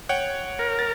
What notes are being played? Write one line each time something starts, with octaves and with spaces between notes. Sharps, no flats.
C#5 F#5 G5
A#4
A6